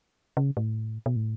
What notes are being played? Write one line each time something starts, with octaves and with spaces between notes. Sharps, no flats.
C#3
A2
B2
A2